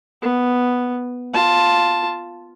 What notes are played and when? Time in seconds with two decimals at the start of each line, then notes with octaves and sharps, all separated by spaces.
0.22 B3
1.34 F4 A5